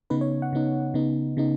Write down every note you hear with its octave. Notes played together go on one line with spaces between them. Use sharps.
C#3 B3 D#4 B4
C#5
F#5
C#3 B3 D#4
C#3 B3 D#4
C#3 B3 D#4